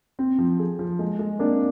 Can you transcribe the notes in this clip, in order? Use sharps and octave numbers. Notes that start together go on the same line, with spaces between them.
C4
F3
G#4
F3
G#3
G#3
A#3 C4 D4